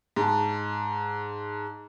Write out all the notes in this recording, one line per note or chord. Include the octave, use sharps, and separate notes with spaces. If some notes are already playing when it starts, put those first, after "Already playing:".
G#2 A5